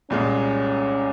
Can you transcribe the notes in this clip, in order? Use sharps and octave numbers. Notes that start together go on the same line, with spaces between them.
C2 A#2 G#3 C#4